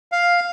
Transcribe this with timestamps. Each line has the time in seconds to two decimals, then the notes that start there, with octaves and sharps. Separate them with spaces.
0.12 F5